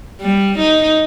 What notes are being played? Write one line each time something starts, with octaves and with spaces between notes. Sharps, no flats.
G3
D#4